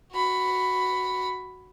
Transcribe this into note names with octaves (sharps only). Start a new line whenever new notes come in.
F#4 B5